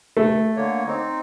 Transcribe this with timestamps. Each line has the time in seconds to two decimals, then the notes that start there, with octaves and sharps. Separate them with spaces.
0.17 A3
0.56 D3 A#3 C#5
0.87 C4 D#4